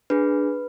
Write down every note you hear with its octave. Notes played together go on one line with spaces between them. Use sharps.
D4 G#4 B4